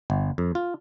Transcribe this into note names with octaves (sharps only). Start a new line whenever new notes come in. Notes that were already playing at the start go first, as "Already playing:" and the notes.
G1
F2
F4